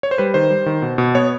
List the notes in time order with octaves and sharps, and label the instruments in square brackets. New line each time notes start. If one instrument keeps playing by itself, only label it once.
[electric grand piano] C#5
C5
G3 B4
D#3 C5
G3
D#3
B2
B2
B3 C#5